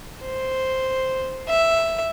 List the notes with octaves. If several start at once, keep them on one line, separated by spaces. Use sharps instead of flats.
C5
E5